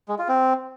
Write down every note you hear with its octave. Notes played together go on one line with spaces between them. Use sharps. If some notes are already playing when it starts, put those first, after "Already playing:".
G#3
F4
C4